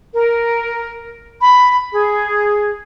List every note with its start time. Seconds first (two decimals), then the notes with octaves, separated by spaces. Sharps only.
0.13 A#4
1.42 B5
1.93 G#4